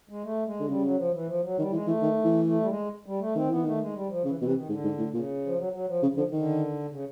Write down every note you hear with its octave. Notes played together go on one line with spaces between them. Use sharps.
G#3
A3
G#3
D3
C#3 G3
F#3
F3
E3
F3
F#3
D#3 G3
E3 G#3
E3 A3
D#3
E3
A3
G3
G#3
G3
A3
D#3 C4
E3 B3
D#3 A3
G#3
G3
F3
C#3 E3
B2 E3
C3
D#3
G#2 D3
G#2
A2
A#2 C#3
F3
F#3
F#3
F3
C#3
D3 F3
D3 D#3
C#3